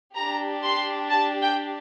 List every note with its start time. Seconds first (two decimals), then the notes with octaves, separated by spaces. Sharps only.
0.15 D4 G4 A#5
0.62 C6
1.10 A5
1.41 G5